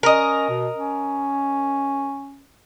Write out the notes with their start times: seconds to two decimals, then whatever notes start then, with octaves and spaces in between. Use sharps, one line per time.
0.03 C#4 A#4 D#5
0.49 B2
0.76 C#4